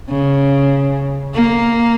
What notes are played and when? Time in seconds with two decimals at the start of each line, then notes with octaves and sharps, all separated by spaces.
0.10 C#3
1.34 A#3